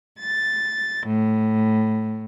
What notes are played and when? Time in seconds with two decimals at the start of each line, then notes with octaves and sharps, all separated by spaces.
0.19 A6
1.06 A2